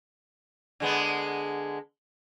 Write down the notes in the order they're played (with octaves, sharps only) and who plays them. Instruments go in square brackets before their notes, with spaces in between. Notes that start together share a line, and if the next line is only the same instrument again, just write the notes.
[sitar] D3 G#3 B3